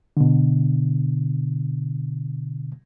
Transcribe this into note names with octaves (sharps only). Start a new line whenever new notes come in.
B2 D3